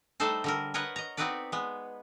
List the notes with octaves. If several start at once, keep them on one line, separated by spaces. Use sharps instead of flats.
G3 A3 D#4 A4 C5
D3 G3 A#4
A#4 B4 C#5 D#5 F#5
D#5 A#5
B3 C4 D#4 F#4 B4 D5
G#3 B3